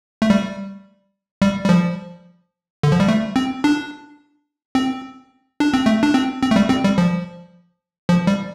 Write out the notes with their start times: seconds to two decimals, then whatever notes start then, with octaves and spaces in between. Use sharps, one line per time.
0.22 A3
0.30 G3
1.42 G3
1.64 G3
1.69 F3
2.83 D3
2.92 F3
3.00 G3
3.09 A3
3.36 C4
3.64 D4
4.75 C4
5.60 D4
5.74 C4
5.86 A3
6.03 D4
6.14 C4
6.42 C4
6.51 A3
6.56 G3
6.70 C4
6.84 G3
6.98 F3
8.09 F3
8.27 G3